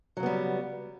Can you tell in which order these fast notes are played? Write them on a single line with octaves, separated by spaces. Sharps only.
F#3 C#3 B3 G3